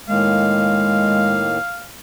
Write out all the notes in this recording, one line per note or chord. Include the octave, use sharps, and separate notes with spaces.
A2 D#3 G#3 A#3 F5